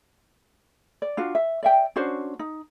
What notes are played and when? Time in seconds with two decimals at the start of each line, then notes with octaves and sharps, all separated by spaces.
1.02 D5
1.17 D4 F4 F#4
1.35 E5
1.63 D5 E5 G5
1.96 C#4 D4 F#4 C5
2.39 D#4